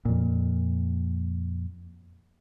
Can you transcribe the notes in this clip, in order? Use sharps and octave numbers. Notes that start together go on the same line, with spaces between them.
F2 A#2